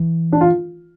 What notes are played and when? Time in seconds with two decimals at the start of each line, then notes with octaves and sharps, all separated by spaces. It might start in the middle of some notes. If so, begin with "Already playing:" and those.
Already playing: E3
0.32 D4
0.41 F4